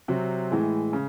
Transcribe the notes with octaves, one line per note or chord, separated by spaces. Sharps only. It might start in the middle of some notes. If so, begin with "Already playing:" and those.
C3 F#3 C4
A2 E3 G#3
C#3